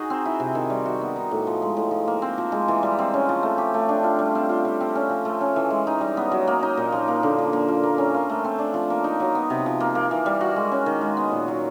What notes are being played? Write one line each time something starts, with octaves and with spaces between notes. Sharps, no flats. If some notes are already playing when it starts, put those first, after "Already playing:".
Already playing: D#4 F#4 G#4
C4
E4
C3
D#3
G3
F#4
B3
D#4
A2
F3
G#3
A2
F3
A#3
C4
F3
G#3
E3
G3
C4
C#4
F3
A3
G4
A3
D4
F4
G3
C4
F4
G3
C4
C#4
F3
A3
C#4
E3
G#3
D#4
G3
B3
F#3
A#3
D#4
A#2
F3
A#3
D3
F3
A#3
F4
A#3
C#4
F4
A3
C4
D4
F3
A#3
D#4
F#3
B3
C3
F3
A#3
A#3
E3
G3
F#4
G#3
C#4
D#3
G#3
B3
A#2
F#3